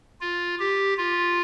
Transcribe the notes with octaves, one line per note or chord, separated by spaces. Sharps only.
F4
G4
F4